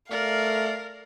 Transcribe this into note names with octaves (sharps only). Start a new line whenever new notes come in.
A3 A#4 D5 F5